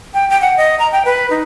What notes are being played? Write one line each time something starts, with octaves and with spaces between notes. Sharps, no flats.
G5
G5
F#5
D#5
A#5
G5
B4
D#4